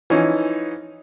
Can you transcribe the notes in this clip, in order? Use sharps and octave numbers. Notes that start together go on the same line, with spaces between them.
E3 F3 C#4 D#4